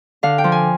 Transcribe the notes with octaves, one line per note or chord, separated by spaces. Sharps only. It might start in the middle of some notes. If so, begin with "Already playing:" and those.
D3 F5
G5
F3
G#5